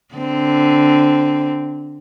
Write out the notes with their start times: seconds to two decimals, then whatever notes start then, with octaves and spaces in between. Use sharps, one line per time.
0.15 D3 C4